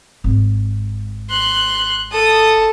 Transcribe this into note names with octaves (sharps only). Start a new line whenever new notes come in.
G#1
C6 F#6
A4 D#6